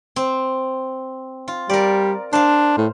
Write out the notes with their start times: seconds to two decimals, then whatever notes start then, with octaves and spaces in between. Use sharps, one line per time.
0.16 C4
1.48 F4
1.70 G3 A#4 D5
2.33 D4 C5 F5
2.78 A2